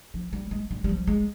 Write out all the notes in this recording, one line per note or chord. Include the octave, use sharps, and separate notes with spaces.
F3
G3
G#3
G3
G3
F3
G#3